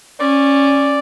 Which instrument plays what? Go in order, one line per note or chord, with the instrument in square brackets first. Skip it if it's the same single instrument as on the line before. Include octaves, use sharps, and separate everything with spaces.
[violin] C#4 [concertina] D5